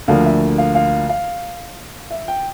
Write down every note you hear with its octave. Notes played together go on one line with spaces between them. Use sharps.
D2 D3 F3 A#3 F5
E5
F5
F5
F5
E5
G5